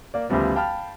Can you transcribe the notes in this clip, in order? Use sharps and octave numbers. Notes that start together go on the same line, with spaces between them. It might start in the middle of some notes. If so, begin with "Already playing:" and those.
A#3 D5
D2 C#3 F3 G3 B3
F5 G5 A5 B5 F6